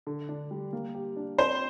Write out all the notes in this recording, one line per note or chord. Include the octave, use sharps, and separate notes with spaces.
D3
D4
G3
A#3
G4
D4
C4 C5